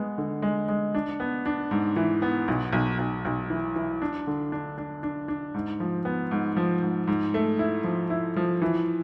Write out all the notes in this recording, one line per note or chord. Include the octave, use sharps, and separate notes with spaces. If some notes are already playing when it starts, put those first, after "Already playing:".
Already playing: G#3 B3
D3
G#3
G#3
D4
B3
D4
G#2
E3
B3
B1
B1
B1
B1
E3
E3
D4
D3
D4
D4
D4
D4
G#2
F3
B3
G#2
F3
G#2
G#2
A3
E4
F3
E4
F3
E3